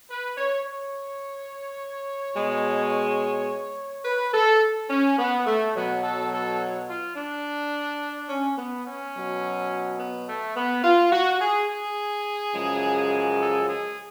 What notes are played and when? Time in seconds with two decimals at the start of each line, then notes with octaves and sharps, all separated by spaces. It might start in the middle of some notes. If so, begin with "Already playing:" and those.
0.09 B4
0.38 C#5
0.66 C#5
2.35 B2 G#3
4.05 B4
4.34 A4
4.90 C#4
5.18 B3
5.46 A3
5.75 B2 F#3 B3
6.03 A4
6.32 A4
6.88 F4
7.16 D4
8.29 C#4
8.58 B3
8.86 C#4
9.15 B2 F#3
9.99 B3
10.28 A3
10.57 B3
10.84 F4
11.12 F#4
11.41 G#4
11.69 G#4
12.54 F#2 C#3 F3 G#3
13.39 A4
13.67 G#4